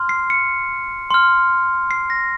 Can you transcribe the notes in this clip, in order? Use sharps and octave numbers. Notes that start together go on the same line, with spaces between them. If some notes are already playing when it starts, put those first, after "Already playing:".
Already playing: C6 F6
C7
C#7
C6 F6
C7
A#6